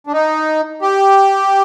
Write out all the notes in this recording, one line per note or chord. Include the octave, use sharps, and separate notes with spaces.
D4
D#4
G4